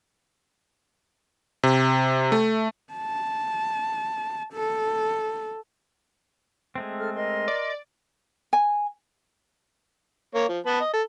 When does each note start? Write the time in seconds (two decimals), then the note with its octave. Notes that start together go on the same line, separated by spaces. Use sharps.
1.63 C3
2.32 A3
2.93 A5
4.53 A4
6.75 G#3 A3 C4
6.99 G#4 A4 F6
7.16 A#4 D#5 C6
7.48 D5
8.53 G#5
10.35 A#3 C#5
10.49 F3
10.66 B3 B4 A5
10.80 D#5
10.93 A4